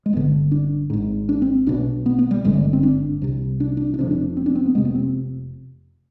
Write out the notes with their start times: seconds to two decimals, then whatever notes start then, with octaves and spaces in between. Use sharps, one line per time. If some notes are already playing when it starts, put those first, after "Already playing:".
0.06 G#3
0.13 G1 G2 D3 B3
0.51 D4
0.90 G#1 G#2
1.29 D4
1.42 C4
1.67 B1 B2 D4
2.06 B3
2.19 B3
2.31 G3
2.44 G#1 G2 D3 G#3
2.54 G3
2.64 G#3
2.73 C4
2.83 D4
3.22 C2 C3
3.60 D4
3.77 D4
3.94 D4
3.99 F1 F2 C3
4.11 D4
4.37 C4
4.46 D4
4.55 C4
4.66 B3
4.75 F1 F2 C3 G#3
4.85 B3
4.95 C4